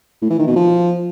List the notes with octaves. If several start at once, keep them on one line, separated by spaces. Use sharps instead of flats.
A2
E3
D#3
B2
F3